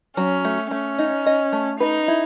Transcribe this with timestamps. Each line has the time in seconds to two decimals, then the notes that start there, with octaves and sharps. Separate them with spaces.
0.17 F#3 C#4
0.45 A3
0.71 A3 C#4
0.99 D#4
1.26 D#5
1.53 A3
1.80 D#4 B4
2.08 E4